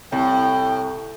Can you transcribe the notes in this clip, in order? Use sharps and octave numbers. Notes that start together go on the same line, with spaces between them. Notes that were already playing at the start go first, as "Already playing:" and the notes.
C2 A2 G5